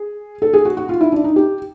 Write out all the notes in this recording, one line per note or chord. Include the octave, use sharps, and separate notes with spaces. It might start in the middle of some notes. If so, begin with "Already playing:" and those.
Already playing: G#4
A4
G#4
F#4
F#4
F4
E4
D4
D#4
G4